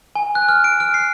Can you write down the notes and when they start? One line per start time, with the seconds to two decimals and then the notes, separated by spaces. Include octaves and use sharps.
0.15 G#5
0.35 F#6
0.49 F6
0.64 D7
0.80 F6
0.94 C7